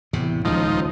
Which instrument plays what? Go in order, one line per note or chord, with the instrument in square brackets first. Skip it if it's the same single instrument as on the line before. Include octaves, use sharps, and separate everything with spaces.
[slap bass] E2 A2 C3
[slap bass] D#1 C#2 [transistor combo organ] F3 D#4